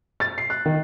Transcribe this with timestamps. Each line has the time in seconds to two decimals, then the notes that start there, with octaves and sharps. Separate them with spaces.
0.20 A6
0.38 C7
0.50 F#6
0.66 D#3